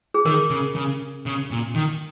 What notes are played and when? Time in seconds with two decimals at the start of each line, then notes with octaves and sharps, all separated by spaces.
0.14 G#4
0.26 D#3 A#4
0.50 C#3
0.75 C#3
1.26 C#3
1.51 A#2
1.75 D#3